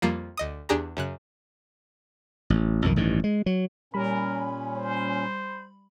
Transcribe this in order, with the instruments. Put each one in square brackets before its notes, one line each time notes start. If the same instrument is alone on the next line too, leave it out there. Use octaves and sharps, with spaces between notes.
[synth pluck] F2 F3 G3 A#3
D2 D#5 D#6
E2 D4 G4 G#4 A#5
F#2 C#3 F#6
[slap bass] A1
B1 F2 D#3
A1 G2 D#3
G#3
F#3
[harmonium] A#2 C#4 [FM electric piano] G3 B5 [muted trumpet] A#4
[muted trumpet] C5